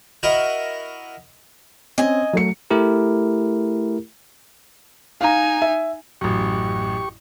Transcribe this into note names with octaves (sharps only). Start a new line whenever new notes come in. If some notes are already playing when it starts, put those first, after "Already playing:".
E4 F#4 A#4 D#5
C4 C#4 D#5 G#5
F#3 A3 C#7
A3 E4 G4 A#4
D#4 F5 G#5 A#5
E5
A1 F#2 G4 C#6